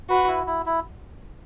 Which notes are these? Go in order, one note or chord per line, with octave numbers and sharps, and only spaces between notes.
F#4 B4
E4
E4
E4